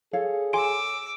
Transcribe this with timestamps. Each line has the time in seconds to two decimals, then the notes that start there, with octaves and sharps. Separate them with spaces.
0.13 G#4 A4 C#5 F5
0.53 G#5 C6 D6 E6 D7